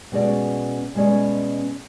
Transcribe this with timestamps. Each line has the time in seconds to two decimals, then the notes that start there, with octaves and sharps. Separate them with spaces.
0.12 B2 G#3 C#4 G#4 D5
0.95 B2 G#3 C#4 G#4 D5